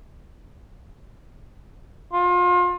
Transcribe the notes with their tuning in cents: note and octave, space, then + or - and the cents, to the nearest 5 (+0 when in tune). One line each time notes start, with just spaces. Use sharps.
F4 +30